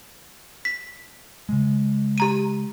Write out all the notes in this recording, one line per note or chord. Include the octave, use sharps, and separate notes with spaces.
B6
C#3 G#3
G4 A#5 D#7